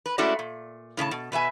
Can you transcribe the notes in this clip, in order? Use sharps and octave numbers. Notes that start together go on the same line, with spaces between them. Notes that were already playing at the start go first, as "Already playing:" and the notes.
B4
G#3 A3 C#4 E4 F#4 D5
A#2
A2 C#3 D#5 A5
B2
B2 B4 E5 G#5